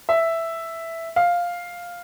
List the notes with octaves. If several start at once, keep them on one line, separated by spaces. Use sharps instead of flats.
E5
F5